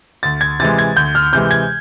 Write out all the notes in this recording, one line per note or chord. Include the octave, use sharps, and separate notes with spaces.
D2 A6
G#6
C3 E3 G#3 A6
G#6
D2 G6
F6
C3 E3 G#3 G6
G#6